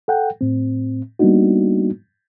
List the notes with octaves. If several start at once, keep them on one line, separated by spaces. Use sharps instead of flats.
A4 F#5 G5
A2 C4
G3 A#3 B3 D4 D#4 F#4